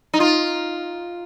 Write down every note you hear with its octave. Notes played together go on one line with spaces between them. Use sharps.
D#4
F4